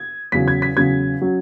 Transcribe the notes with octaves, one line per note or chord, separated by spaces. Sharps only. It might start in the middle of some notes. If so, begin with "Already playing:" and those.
Already playing: G#6
E2 C#3 F#3 C#4 B6
G#6
B6
E2 C#3 F#3 C#4 G#6
F#3 C#4